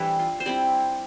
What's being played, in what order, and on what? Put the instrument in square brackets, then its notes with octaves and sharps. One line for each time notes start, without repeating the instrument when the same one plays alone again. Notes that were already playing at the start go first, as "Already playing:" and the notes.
Already playing: [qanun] E3 G3 A3 C4 D4 E4
F4
C5
G3 C4 E4 D5